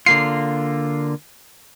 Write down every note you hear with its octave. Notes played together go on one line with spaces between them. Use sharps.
D3 A#3 F4 C7